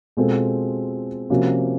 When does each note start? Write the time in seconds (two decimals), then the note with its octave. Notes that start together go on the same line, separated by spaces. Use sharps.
0.17 B2 G#3 C4 F4 A4
1.30 C3 F3 A#3 C#4 F#4